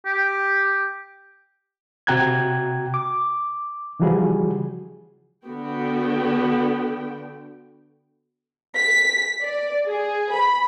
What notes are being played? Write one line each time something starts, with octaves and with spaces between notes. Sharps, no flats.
G4
C3 F#4 G5 A#5 F#6 G#6
D6
C#3 E3 F3 G3 F#4 G#4
D3 B3 F#4 G5
B6
D5
G#4
B5